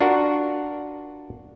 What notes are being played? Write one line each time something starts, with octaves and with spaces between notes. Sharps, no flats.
D4 F4 F#4 A#4 F#5